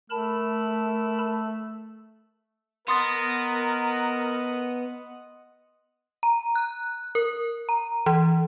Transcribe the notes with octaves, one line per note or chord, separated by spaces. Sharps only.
A3 A#4 A5 B5
B3 A#4 D#5 F#5 C6 D#6 A6
A#5
F#6
A#4
A#5
E3